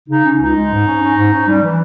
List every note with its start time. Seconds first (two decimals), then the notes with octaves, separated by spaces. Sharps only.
0.08 C#3 D#4
0.23 C#4
0.38 C#2 D#4
0.54 G#3
0.70 G#2
0.86 C#4
1.01 C#4
1.17 G#2
1.32 C#4
1.47 G3
1.62 E3